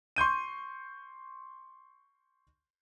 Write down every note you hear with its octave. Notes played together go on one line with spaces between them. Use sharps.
C6 C#6 G6 D#7